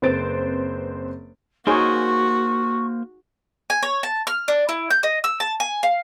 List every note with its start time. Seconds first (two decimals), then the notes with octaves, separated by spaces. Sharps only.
0.02 F#1 C4 B4 C5 A6 D7
1.67 A#3 D#4 F#4 G#4 C5 C#5 C#6
3.70 G#5
3.83 C#5
4.03 A5
4.27 F6
4.48 D4
4.69 E4
4.90 G6
5.03 D#5
5.24 E6
5.40 A5
5.60 G#5
5.83 F5